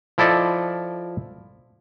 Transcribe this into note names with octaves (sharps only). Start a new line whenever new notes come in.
F3 E4 A4 D5 D#5